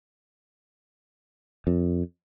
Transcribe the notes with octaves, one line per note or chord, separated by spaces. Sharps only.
F2